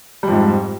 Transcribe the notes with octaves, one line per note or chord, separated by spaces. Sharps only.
F2 G#2 G3